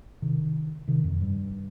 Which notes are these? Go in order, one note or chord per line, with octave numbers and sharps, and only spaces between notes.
C3 D#3
C3 D#3
F2
G2